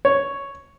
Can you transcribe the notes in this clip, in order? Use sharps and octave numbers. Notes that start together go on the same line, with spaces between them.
C#5